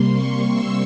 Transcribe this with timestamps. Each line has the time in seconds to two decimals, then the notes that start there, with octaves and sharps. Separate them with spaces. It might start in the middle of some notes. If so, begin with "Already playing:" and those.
Already playing: C3 G3 A#3 C6
0.12 C#6
0.52 E6